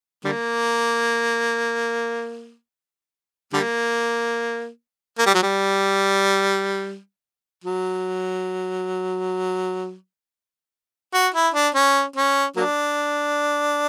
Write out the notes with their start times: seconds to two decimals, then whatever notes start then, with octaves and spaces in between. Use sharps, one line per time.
0.25 D3 G3 A#3
3.53 D3 G3 A#3
5.18 A#3
5.26 G3
5.34 F#3
5.43 G3
7.64 F#3
11.13 F#4
11.34 E4
11.54 D4
11.75 C#4
12.16 C#4
12.56 F#3 A#3 D4